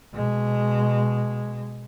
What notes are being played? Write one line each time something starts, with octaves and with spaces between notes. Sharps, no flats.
B2 G#3